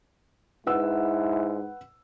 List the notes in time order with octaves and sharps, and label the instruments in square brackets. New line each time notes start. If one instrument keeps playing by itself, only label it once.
[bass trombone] G#2 [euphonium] E4 [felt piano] B4 F#5 E6